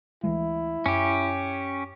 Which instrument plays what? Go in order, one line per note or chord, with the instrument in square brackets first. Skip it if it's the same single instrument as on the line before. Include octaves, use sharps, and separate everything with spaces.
[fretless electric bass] D2 E3 G#3 [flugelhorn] E4
[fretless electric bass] F#2 [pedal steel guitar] C#4 G4